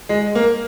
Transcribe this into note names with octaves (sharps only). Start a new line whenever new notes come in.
G#3
A#3